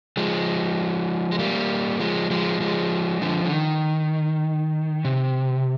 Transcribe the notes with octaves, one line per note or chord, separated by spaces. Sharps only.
F3 G#3
G#3
G3 A#3
F3 G#3
F3 G#3
F3 G#3
D3 F3
D3
D#3
C3